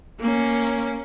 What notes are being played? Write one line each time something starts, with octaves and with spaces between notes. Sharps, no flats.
A#3 C#4